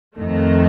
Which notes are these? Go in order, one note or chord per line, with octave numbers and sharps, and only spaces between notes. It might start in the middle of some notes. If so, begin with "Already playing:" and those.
F2 D#3 A3